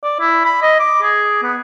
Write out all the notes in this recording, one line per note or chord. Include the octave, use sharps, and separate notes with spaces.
D5
E4
B5
D#5
D6
G#4
B3